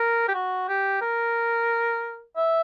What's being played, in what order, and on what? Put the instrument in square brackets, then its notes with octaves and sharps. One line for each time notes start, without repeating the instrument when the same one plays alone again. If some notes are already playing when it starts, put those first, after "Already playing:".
Already playing: [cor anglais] A#4
G4
F#4
G4
A#4
E5